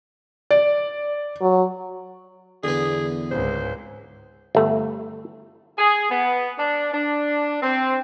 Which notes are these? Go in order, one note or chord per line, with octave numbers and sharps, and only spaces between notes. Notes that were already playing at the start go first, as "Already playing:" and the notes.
D5
F#3
E2 D3 B3 G#4
C#2 G#2 C5
G1 A3
G#4
B3
D4
D4
C4